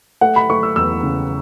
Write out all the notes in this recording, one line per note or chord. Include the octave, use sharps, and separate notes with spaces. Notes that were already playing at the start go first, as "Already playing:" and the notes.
A3 F#5
B5
A3 C#6
E6
E2 E6
C#3